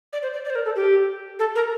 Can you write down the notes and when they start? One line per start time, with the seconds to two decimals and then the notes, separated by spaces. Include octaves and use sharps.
0.13 D5
0.23 C5
0.34 D5
0.45 D5
0.50 C5
0.55 A#4
0.65 A4
0.76 G4
1.39 A4
1.55 A#4